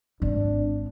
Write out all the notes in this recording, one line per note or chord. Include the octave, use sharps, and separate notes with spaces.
G#1 D4